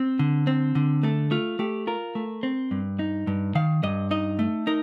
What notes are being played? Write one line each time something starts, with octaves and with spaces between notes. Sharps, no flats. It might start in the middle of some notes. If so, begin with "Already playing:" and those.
Already playing: C4
D3
C4
D3
A3 A4
A3 F4
A3 G4
F4 A#4
A3
C4
G2
D#4
G2
D#3 F5
G2 D#5
D#4 D#5
A3
D#4 A#4